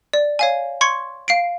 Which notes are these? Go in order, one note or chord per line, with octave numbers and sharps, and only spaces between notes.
D5
C#5 F5 G#5
C6 C#6 G#6 C#7
F5 C7 D7